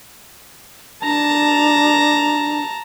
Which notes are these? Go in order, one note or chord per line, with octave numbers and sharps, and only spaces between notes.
D4 A5 A#5